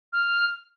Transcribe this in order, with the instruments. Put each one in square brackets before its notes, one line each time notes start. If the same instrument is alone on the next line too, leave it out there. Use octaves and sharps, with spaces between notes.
[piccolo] F6